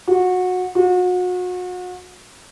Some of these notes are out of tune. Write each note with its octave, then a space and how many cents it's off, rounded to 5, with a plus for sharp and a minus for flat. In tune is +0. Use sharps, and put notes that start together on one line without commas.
F#4 -20
F#4 -35